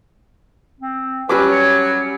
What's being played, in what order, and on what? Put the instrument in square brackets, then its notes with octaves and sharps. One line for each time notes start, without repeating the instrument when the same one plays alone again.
[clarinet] C4
[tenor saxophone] F#3 [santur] G3 C#4 D6 [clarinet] B4
[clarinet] C#5